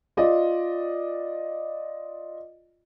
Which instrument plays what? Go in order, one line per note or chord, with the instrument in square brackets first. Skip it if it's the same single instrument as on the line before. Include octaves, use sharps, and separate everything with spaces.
[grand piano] F4 D5 D#5